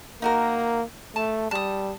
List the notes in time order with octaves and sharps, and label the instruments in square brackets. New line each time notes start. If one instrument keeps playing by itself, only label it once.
[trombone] A#3 [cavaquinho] D#4 F#4 A#4
[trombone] A3 [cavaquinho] A5
[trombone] G3 [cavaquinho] A5 D#6